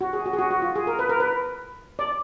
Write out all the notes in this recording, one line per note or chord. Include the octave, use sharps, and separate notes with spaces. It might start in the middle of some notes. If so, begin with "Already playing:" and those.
F#4
G#4
F#4
G#4
F#4
F#4
F4
G#4
A#4
B4
A#4
B4
D5